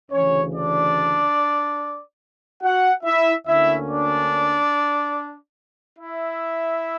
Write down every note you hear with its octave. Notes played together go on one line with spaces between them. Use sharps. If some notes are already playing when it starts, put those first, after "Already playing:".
D2 C#3 E3 C#4 C#5
D4 D5
F#4 F#5
E4 E5
D2 D3 A#3 C#4 E4 E5
D4 D5
E4 E5